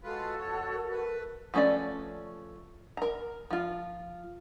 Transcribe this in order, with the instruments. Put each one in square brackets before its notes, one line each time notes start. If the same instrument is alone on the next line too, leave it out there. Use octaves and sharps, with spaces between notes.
[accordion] G#3 F4 B4 [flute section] F#4 A4
[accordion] F2 C#5
[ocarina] A#4
[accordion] A3 B4
[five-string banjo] F3 A3 C#4 B4 D5
A#4 A#5
F3 F4